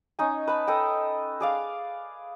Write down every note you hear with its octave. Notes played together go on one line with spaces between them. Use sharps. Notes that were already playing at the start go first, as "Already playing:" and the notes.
C#4 D#4 G#5
B4 A5 B5
A4 D#5 G5
G#4 D5 F5